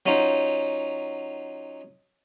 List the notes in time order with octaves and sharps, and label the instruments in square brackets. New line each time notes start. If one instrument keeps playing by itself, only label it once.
[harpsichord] F#3 C#4 D#4 F4 C5